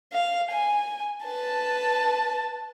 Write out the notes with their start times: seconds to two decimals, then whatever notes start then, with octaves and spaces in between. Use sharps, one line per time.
0.13 F5
0.52 G#5
1.26 B4 A5